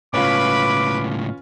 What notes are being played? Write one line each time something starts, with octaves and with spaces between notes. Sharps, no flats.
C#2 A2 C#4 F4 B4 B5 D6